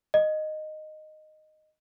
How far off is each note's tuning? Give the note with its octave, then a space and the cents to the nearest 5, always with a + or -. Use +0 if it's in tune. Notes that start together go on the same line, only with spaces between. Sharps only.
D#5 -10